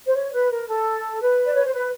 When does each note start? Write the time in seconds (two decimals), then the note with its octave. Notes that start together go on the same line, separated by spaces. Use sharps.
0.06 C5
0.16 C#5
0.34 B4
0.51 A#4
0.68 A4
1.21 B4
1.46 D5
1.55 C#5
1.64 C5
1.73 B4